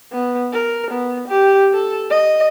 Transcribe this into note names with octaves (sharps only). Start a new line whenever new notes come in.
B3
A#4
B3
G4
A4
D#5